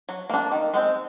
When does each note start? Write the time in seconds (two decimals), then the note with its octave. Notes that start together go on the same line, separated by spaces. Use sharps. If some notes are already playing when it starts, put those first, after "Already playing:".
0.09 F#3
0.30 A#3 D4
0.52 D#3
0.74 G#3 C4